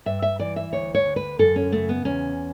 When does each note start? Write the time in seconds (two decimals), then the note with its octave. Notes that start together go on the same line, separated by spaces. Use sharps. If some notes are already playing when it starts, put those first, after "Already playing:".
0.06 G2 E5
0.22 E5
0.39 E3 D5
0.56 E5
0.72 D2 C#5
0.95 C#5
1.06 D3
1.16 B4
1.39 F#2 A4
1.56 C#4
1.72 C#3 A3
1.89 B3
2.05 E2 C#4